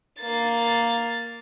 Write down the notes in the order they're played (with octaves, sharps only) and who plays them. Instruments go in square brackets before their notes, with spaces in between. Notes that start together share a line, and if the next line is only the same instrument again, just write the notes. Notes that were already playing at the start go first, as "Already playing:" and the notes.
[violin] A#3 A6